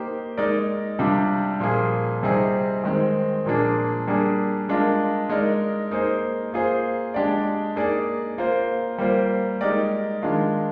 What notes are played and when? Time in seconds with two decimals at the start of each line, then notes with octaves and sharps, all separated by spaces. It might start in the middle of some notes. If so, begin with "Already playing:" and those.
Already playing: A#3 D#4 G4 C5
0.37 G#3 D#4 A#4 D5
0.99 C3 G3 D4 F4
1.60 A#2 F3 A#3 F4 G#4
2.23 C3 G3 C4 D#4 G#4
2.84 D#3 G#3 C4
3.46 A#2 F3 A#3 D4 G#4
4.07 G3 A#3 D4 G#4
4.69 G#3 D4 F4 A#4
5.29 G#3 D#4 A#4 D5
5.91 A#3 D#4 G#4 C5
6.53 A#3 F4 G#4 C5
7.14 G#3 D4 G4 D5
7.76 A#3 D#4 G#4 D5
8.38 A#3 F4 C5
8.98 G3 A#3 F4 C5
9.61 G#3 D#4 G4 A#4 D5
10.22 D#3 G#3 D4 F4